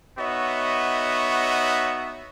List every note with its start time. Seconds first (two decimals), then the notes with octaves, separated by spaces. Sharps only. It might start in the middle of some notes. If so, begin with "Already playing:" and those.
0.18 B3 D#4 F#4 C#5 D#5 E5